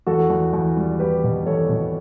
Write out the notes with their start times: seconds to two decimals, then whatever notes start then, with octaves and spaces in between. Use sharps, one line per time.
0.06 E2 F#4 A4
0.30 E2
0.53 E2
0.77 G3
0.99 E2 G4 B4
1.24 B2
1.46 E2 A4 C#5
1.69 B2